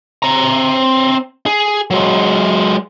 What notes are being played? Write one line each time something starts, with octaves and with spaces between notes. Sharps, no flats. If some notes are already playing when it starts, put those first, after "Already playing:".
C4 A#5
G#4
F#3 G#3